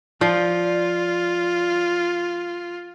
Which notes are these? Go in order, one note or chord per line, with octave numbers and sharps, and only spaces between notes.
F3 F4 D5